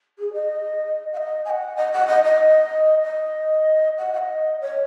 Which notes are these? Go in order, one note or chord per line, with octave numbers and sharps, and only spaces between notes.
G#4
D#5
F#5
D#5
G#5
F#5
D#5
F#5
D#5
D#5
D#5
F#5
F#5
D#5
C#5